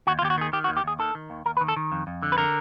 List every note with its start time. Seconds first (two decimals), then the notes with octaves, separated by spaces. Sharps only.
0.07 D#2 F#4
0.19 F4
0.22 D#2 G4
0.30 F#4
0.38 D#3 G#4
0.53 D#3 G4
0.64 F#4
0.69 D#2
0.77 G4
0.84 D#2 G#4
0.99 D#3 A4
1.15 D#3
1.30 D#2
1.46 D#2 A#4
1.57 B4
1.61 D#3
1.68 A4
1.76 D#3
1.92 F2
2.07 F2
2.22 D3
2.32 B4
2.38 D3 A#4